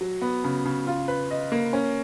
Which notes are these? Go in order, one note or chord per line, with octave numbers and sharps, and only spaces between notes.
F#3
B3
C#3
C#3
F4
B4
D#5
A#3
C#4